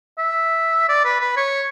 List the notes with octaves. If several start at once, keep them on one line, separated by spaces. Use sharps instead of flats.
E5
D5
B4
B4
C#5